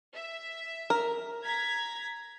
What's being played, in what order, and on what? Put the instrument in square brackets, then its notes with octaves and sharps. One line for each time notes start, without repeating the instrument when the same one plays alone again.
[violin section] E5
[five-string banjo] A#4
[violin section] A#5 G#6 B6